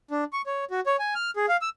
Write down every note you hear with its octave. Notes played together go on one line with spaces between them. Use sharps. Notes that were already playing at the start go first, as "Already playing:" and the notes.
D4
C#6
C#5
F#4
C#5
G#5
F6
G#4
F5
E6